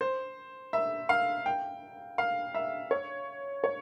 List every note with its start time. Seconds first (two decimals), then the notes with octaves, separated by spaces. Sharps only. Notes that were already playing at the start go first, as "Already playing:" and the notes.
0.01 C5
0.73 E5
1.09 F5
1.46 G5
2.18 F5
2.54 E5
2.91 C#5
3.64 C#5